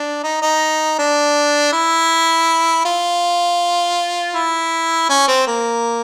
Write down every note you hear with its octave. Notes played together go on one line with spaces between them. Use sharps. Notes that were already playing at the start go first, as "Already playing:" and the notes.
Already playing: D4
D#4
D#4
D4
E4
F4
E4
C#4
C4
A#3